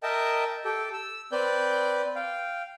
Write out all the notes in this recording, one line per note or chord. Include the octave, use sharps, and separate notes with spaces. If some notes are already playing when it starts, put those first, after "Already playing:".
A#4 D#5 E5 G5 A5
G4 A4 G5
E6
C4 B4 D5 G6
F5 G5